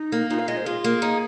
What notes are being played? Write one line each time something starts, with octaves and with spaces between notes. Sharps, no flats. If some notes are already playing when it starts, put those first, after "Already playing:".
Already playing: D#4
A#3
A#2 D#4
F5
G#3 D#5
C5
F4 G#4
A#3
D#4